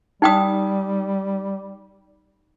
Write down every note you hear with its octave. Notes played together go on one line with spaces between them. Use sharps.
G3 D#4 G5 D#6